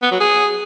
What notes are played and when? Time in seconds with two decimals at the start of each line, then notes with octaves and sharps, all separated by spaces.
0.02 B3
0.11 F#3
0.20 G#4